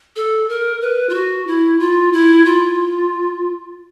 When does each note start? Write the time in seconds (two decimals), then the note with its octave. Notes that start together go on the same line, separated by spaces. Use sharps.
0.16 A4
0.49 A#4
0.81 B4
1.09 F4
1.14 F#4
1.47 E4
1.80 F4
2.13 E4
2.45 F4